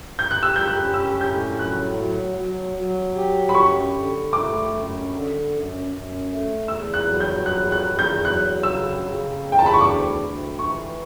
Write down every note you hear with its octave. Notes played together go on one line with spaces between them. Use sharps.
G6
F#6
G4 E6
G6
F#6
C#4
E6
A2 G6
F#3 F#6
F#3
F#3
F#3
G4
B5
F#2 C#6
D3
A3 D6
F#2
D3
F#2
F#2
A3
E2 E6
F#6
F#3
G6
E2 F#6
F#6
E2
G6
F#3 F#6
C#3 E6
C#3
E2
G5
A5
B5
C#6
D2 D6
D2
E3 C#6